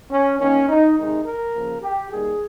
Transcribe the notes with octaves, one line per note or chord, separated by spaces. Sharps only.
C#4
D#3 A#3 C#4
D#4
C3 D#3 G#3 D#4
A#4
C#3 F3 A#3
G4
D#3 G3 A#3 G#4